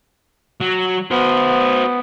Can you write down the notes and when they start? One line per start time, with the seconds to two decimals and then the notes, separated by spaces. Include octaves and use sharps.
0.61 F#3
1.11 B3 F#4 C5